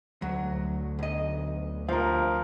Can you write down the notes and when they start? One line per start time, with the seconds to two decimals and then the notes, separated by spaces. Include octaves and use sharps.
0.22 D2 F#3
0.99 B1 D#5
1.89 C3 F3 A#4 F5